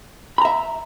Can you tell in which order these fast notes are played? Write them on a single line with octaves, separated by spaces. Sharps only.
B5 A#5 E5